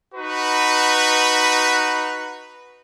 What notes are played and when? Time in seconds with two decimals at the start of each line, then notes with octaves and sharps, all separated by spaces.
0.13 D#4 F#4 B4